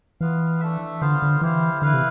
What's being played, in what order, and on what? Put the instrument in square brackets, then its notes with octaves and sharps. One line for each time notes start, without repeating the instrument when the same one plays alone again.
[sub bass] E3 [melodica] B3 F4 B4 F5
[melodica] A3 D4 A4 E5
[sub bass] D3 [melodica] B3 F4 C5 F5
[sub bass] D3
[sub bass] E3 [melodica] E4 G4 C5 F5
[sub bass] D3 [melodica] E4 B4 F5
[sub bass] C3